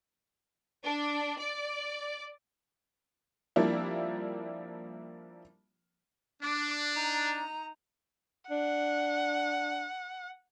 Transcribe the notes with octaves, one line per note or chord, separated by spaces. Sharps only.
D4
D5
F3 G3 A#3 C4 D4 E4
D4 D6
D#4 A#5
D4 F#5